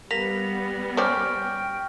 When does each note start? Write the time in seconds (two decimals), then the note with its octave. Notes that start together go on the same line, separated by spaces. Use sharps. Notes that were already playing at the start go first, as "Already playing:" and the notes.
0.11 G3 A#3 B3 A#6 B6 F7
0.97 C#4 C5 D5 G5 C#6 F6